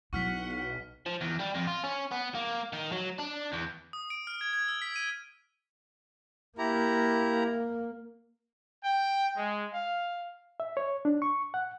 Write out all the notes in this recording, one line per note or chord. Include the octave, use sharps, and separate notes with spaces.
B1 F#3 E4 F#5 C#6 F6 B6
F3
E2
G3
F2
F4
C#4
B3
A#3
D#3
F#3
D4
E2
D#6
D7
F6
G#6
G#6
E6
B6
D#7
A#3 E4 G4 A#5
G5
G#3
F5
E5
C#5
D4
C#6
F#5